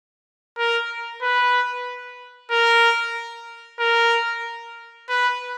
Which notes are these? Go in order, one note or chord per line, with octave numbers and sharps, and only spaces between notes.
A#4
B4
A#4
A#4
B4